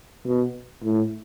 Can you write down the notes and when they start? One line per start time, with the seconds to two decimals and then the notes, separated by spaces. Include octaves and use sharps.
0.25 B2
0.83 A2